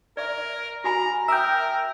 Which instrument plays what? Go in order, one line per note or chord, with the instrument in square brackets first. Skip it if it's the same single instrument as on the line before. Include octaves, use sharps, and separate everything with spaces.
[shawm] A#4 [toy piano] D5 E5
[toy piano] F#4 G#5 B5 [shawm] A#5
[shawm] A#4 [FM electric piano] E5 G5 [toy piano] A#5 D#6